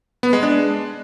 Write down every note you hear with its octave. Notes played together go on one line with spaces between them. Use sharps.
B3
G#3
D4